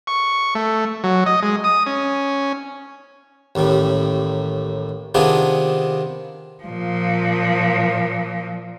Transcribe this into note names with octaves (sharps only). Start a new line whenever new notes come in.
C#6
A3
F#3
D#5
G#3
D#6
C#4
A1 D#2 A2 G3
C3 D#3 B3 D4 F4 G#4
A#2 F3